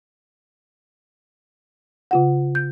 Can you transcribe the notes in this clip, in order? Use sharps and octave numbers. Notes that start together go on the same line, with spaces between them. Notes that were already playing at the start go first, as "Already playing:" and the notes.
C#3 F4 F#5
G6